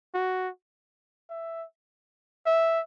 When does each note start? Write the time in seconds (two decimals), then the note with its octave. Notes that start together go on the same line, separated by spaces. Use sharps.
0.14 F#4
1.30 E5
2.46 E5